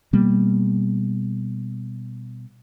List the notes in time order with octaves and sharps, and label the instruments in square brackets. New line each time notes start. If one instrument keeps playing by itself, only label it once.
[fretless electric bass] B2 G3 A#3 B3